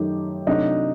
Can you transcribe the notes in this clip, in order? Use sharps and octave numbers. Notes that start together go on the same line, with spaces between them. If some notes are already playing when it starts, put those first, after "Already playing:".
Already playing: F#2 D#3 A3 D#4 G4
C3 F#3 A3 D4 D#4 F#4